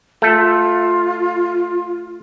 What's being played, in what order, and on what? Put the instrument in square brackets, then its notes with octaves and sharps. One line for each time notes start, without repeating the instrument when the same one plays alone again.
[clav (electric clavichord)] A3 A4 [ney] F4